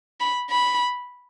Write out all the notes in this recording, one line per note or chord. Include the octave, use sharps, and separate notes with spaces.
B5
B5